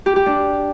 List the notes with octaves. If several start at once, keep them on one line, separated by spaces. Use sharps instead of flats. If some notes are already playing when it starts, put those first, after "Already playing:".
G4
G4
D4